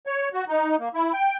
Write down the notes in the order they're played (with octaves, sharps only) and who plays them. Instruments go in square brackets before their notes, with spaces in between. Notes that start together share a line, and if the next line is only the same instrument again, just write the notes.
[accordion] C#5
F#4
D#4
A#3
E4
G5